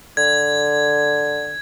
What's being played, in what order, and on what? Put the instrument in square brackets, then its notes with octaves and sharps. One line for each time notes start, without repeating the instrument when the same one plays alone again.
[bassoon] D3 [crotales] G#6